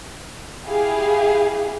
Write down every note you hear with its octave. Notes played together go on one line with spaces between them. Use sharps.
E4 G4 G#4 F5